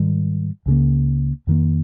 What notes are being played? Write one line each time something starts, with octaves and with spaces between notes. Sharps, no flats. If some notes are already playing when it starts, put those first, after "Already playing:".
Already playing: G#2 D#3 G3
C#2 C#3 F3 A#3
F2 D#3 A#3